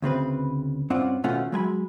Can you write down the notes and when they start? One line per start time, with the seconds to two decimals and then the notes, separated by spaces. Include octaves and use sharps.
0.02 D2 C#3 C4 B4
0.90 G2 C4 C#4 F4 D5 F#5
1.24 D#2 B2 A3 C#4 F4 F#5
1.52 F#3 G#3 G#5 B5